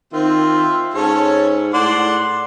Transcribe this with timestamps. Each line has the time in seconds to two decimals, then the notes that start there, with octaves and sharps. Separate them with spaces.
0.13 D#3 C4 F4 E5
0.94 G#2 C#4 A4 C#5
1.74 A2 D5 F#5 C6